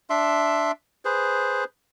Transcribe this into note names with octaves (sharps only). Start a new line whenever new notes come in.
D4 E5 C6
G#4 B4 C5